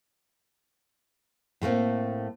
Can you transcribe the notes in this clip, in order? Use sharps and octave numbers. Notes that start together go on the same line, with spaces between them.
A2 A3 A#3 C4